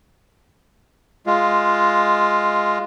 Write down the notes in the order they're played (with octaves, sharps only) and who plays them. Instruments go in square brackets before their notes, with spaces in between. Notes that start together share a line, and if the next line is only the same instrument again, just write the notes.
[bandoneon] G#3 F4